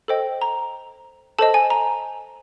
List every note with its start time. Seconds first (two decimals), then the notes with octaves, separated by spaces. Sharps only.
0.08 A4 C5 D#5 G5
0.41 A#5
1.39 A4 C5 D#5 A5
1.54 G#5
1.70 A#5